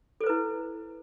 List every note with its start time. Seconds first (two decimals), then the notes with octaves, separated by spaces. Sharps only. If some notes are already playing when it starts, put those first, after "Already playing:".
0.21 A4
0.24 C5
0.26 B4
0.29 E4